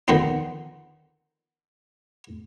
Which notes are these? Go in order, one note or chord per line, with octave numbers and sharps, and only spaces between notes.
D3 D#3 F3 B3 C4 D#4